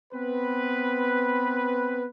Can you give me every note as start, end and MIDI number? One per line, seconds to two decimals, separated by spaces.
0.13 2.06 59
0.13 2.06 60
0.13 2.06 71